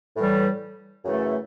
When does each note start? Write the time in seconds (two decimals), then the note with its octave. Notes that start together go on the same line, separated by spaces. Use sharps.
0.16 A2 E3 G3
1.05 F#2 C#3 E3 A3